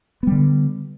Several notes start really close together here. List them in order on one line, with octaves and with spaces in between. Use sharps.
B3 G3 D3